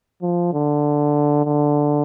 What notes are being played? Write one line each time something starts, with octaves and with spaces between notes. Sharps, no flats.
F3
D3
D3